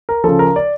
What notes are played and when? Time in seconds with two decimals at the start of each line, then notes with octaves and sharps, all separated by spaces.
0.09 A#4
0.24 C#3 F3 A4
0.39 A#4
0.56 D5